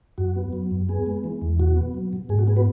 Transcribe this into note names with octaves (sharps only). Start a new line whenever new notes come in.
F#2 F#4
B3
F#3
F#2
B3 G#4
G#3
E3
E2
B2 F#4
B3
F#3
B2
G#2 G#4
F#4
B3 G#4
F#4 B4